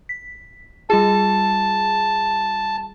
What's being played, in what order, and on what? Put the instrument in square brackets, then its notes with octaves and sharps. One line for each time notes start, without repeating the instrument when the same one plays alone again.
[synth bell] B6
[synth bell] G3 F4 G#4 [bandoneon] A5